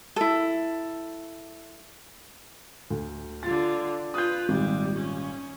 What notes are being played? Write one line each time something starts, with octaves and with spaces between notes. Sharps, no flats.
E4 A4
D2
D3 F4 A6
F4 B4 D#6 G6
G#1 A#2 G3
C#4